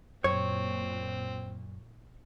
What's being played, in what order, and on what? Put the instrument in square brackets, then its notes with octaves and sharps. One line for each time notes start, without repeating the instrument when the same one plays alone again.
[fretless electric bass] F#2 [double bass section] A#2 [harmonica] C4 [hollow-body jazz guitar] C#5